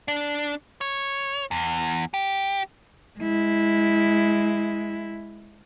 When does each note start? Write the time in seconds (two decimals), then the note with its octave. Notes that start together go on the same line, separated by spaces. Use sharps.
0.08 D4
0.81 C#5
1.51 E2
2.14 G4
3.20 G#3 E4